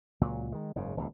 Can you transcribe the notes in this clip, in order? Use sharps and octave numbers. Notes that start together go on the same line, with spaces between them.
C#2 A#2 F#3
D#3 G#3
F#1 G#2 C#3
D#1 C#2 A2